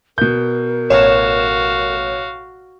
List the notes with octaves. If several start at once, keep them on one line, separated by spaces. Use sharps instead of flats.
B2 A#4 G6
A1 F#4 C#5 F5 E7